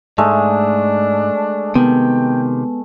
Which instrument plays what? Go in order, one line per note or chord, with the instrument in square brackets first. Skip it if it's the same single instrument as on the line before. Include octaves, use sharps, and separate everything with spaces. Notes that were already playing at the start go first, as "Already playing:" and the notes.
[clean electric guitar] G#2 [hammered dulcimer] G#3 A3 [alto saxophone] D4
[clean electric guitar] C3 D#3 [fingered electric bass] B3 [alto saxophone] G5